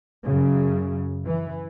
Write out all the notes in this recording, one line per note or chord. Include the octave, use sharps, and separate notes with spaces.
F#2 C#3
E3